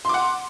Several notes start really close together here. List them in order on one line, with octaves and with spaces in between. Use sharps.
C6 D6 F#5